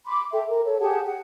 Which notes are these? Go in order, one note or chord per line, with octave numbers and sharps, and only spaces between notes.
B5 C6 D6
A4 E5 G5
A#4
A4 C#5
G4 G#4 F#5 A5
F#5